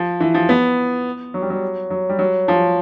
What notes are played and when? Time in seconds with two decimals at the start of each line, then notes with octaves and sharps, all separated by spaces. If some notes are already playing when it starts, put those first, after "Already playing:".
Already playing: F3
0.20 E3
0.34 F3
0.49 B3
1.34 F#3
1.42 G3
1.50 F#3
1.90 F#3
2.09 G3
2.19 F#3
2.48 F3